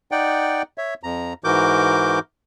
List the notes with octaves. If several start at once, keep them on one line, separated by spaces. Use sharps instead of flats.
D#4 D5 F#5 G5
C#5 E5
F2 A#5
G#2 E3 F#4 A#4 D6 G6